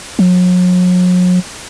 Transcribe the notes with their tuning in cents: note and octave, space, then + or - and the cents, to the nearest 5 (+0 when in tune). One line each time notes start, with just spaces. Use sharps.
F#3 -40